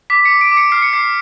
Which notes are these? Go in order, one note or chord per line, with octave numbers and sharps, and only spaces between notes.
D6 B6
C#7
D6
D7
D6
C#7
F6 C7
C#7
D6 C7